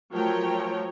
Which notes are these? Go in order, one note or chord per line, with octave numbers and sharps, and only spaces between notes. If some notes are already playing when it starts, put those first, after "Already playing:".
F3 F#3 A3 A#4 C#5 G5